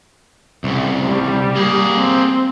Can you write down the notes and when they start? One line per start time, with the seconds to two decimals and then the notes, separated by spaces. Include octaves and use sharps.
0.64 C2 C#3
1.07 G3
1.56 A#3 G#4
1.96 C4